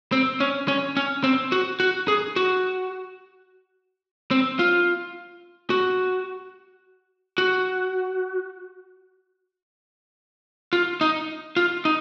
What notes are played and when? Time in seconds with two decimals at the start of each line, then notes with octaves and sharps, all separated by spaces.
0.12 C4
0.40 C#4
0.68 C#4
0.97 C#4
1.24 C4
1.52 F#4
1.80 F#4
2.08 G#4
2.36 F#4
4.31 C4
4.59 F4
5.70 F#4
7.38 F#4
10.73 F4
11.01 D#4
11.56 F4
11.85 D#4